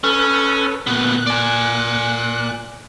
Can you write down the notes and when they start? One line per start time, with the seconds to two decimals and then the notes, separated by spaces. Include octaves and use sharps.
0.04 C#4 A4 B4
0.87 D2 A#2 B3 F#6
1.27 D5 G#5